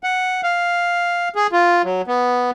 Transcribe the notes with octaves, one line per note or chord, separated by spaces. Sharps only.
F#5
F5
G#4
F4
F#3
B3